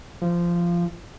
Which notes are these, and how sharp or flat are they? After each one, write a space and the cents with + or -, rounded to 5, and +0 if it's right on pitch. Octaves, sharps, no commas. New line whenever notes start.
F3 -15